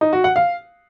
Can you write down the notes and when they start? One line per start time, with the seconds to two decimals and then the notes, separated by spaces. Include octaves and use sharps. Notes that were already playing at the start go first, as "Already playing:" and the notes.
0.01 D#4
0.13 F#4
0.24 F#5
0.36 F5